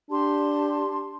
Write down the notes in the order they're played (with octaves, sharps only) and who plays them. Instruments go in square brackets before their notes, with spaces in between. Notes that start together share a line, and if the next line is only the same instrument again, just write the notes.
[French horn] D4 [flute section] G4 A5 C6